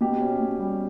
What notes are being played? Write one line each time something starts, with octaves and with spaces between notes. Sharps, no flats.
B2 G4
C#4
B2
G3